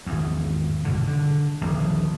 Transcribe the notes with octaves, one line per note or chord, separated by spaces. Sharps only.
G#1 E2
B1 G2 D3
D3
D#1 A#1